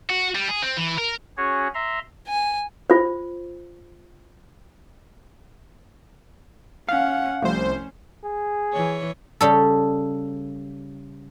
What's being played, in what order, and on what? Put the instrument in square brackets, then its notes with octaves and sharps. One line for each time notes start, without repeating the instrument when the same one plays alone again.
[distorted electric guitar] F#4
G3
G#4
C4
E3
A#4
[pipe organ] C#4 F#4 G#4 C#5
E5 A#5 C6
[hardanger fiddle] G#5
[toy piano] F4 C5
[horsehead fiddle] C#4 F#5 [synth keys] F5
[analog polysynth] C2 C5 [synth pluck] F3 A3 [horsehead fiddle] C#4
[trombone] G#4
[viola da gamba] E3 C#5
[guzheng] C#3 G3 A4